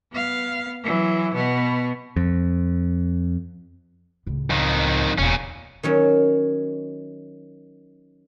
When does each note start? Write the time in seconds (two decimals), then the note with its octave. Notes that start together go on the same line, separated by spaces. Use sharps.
0.12 B3 F5
0.83 E3 F#3
1.34 B2 B3
2.16 F2
4.26 C#2 A2
4.50 F2 D#3
5.18 E1 A#2 C#4
5.83 D#3 F#3 C#4